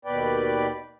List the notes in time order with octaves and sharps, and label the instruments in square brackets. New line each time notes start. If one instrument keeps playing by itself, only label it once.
[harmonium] D#2 B2 B4 D5 G5